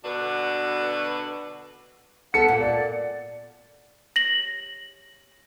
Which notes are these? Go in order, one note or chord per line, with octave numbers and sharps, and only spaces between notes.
B2 D3 D4 F#4 B4
B3 A4 F#5 C#7
A#2
D5
A#6 F#7